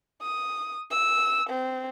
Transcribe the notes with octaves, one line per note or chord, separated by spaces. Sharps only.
D#6
E6
C4